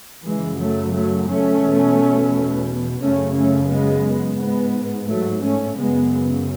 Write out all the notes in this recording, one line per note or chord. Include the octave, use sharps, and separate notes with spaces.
F#2 C#3 E3 G#3
F#3 A3
F#3 A3
A3 C#4
E2 B2
F#2 C#3 A3 C#4
A3 C#4
G#3 B3
G#2 G#3 B3
F#3 A3
A3 C#4
F#2 C#3 G#3 B3